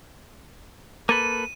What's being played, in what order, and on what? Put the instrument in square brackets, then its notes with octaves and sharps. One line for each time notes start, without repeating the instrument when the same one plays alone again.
[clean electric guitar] A#3 A4 B4 [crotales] D#7